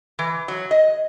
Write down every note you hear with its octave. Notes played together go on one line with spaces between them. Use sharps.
E3
F#3
D#5